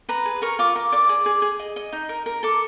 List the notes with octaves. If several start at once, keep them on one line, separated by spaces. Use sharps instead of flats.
B4 A#5
G#4
A#4 C#6
F4 D6
A#4 D6
D5 D6
G#4
G#4
G#4
D#5
D#5
D#4
A#4
A#4
A4 D6